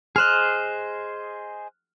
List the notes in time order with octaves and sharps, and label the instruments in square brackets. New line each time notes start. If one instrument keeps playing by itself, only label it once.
[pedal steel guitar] G#4 C5 D#5 [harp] F6 F#6